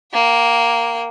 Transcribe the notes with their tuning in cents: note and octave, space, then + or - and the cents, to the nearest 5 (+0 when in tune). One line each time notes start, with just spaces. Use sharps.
A#3 +0 G5 -30